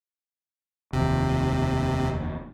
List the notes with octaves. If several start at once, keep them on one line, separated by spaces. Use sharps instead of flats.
F1 D#2 C3